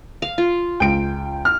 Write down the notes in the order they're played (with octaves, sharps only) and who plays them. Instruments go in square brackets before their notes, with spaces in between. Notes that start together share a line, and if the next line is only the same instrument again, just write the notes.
[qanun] F5
F4
[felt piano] C#2 [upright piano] G5 D7
[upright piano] F6